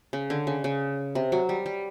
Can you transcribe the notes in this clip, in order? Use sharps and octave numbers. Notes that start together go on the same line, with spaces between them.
C#3
D3
C#3
C#3
C3
F#3
G3
G3